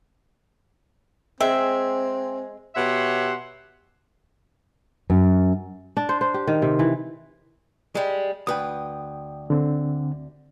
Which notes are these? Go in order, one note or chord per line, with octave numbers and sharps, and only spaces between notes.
G#3 C4 E5 G5
B2 G4 C#5 E5 F#5 C6
F#2
D4
C5
C5
G4
D#3
C3
E3
G3 G#3
D2 B4 G5 D#6
D3 C4